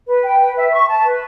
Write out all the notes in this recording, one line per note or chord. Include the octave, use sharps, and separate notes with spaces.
B4
G5
B4
E5
C#6
A5
B4